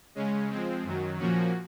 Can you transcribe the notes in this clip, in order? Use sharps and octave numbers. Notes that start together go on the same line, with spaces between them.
C#3 G#3 C#4
F3 G#3 C4
F#2 D#3 F#3
A#2 F3 A#3 C#4 F#4